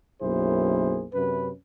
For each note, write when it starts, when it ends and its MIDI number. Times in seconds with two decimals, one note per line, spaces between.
0.22 1.06 35
0.22 1.06 42
0.22 1.06 58
0.22 1.06 64
0.22 1.06 68
0.22 1.06 72
1.14 1.50 42
1.14 1.50 48
1.14 1.50 61
1.14 1.50 71